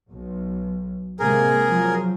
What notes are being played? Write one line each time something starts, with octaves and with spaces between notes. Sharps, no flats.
B1
C3 G#3 A#3 G#4 A#4
F3 F#3